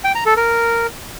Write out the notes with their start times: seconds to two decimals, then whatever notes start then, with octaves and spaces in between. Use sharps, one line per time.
0.04 G5
0.15 A#5
0.26 A4
0.37 A#4